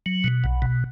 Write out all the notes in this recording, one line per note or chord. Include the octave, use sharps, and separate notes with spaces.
F#3
B2
B1
B2